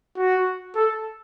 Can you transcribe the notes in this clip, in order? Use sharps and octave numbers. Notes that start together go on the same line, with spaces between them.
F#4
A4